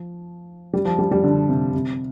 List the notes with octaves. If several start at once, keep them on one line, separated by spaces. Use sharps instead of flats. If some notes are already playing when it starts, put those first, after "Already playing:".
Already playing: F3
G3
F3
G3
G3
D3
C3
C3